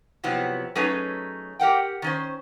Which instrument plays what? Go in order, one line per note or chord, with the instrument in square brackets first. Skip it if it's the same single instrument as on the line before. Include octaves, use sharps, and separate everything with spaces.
[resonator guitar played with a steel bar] C3 F3 F#3 B3 E4
F#3 A3 C#4 D#4 G#4 B4
G4 A#4 F#5 G5
D#3 C#4 C5